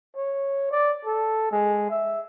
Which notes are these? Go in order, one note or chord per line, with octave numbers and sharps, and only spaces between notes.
C#5
D5
A4
G#3
E5